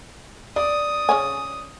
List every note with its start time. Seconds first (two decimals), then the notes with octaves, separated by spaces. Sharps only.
0.56 D5 D#6
1.09 C#3 C#4 G#5